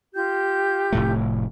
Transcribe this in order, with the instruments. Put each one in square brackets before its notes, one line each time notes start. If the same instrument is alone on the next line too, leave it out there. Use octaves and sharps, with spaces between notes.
[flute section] F4 G4 G6
[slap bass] F1 A2 A3